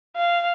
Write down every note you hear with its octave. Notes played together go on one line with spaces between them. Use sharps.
F5